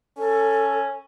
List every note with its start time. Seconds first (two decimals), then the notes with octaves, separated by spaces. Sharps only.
0.18 C#4 A4